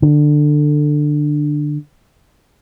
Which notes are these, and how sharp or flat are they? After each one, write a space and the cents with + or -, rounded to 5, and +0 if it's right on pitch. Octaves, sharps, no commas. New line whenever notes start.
D3 +15